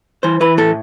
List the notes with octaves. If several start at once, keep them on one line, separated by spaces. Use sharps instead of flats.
E3 C5
E3 B4
A2 A4